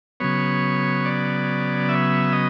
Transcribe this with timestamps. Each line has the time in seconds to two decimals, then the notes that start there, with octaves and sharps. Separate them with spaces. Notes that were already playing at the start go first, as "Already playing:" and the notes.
0.20 C#3 F#3 B3 C#5
1.05 D5
1.89 E5
2.32 D#5